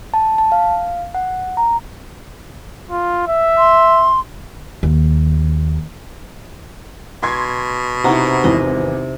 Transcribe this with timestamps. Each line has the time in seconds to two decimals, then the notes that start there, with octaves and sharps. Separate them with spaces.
0.14 A5
0.38 A5
0.52 F5
1.15 F#5
1.57 A#5
2.91 F4
3.28 E5
3.58 C6
4.83 D#2
7.23 B2 C6 G#6 C7
8.04 C3 D#4 E4 F#5 A#5 C#6
8.44 G#1 E2 E3 D#5